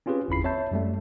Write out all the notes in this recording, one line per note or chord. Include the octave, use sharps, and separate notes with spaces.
C4 C#4 F4 G4 G#4 B4
G1 E2 E4 B5 C7
C4 C#5 E5 A5 G6
F#2 G3 A3